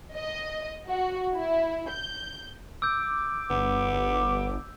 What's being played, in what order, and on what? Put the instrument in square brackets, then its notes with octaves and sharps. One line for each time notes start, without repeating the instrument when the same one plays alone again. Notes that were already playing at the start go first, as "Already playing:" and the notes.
[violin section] D#5
F#4
E4
G6
[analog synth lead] D6 [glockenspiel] E6 G6
[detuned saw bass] G1 [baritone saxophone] B3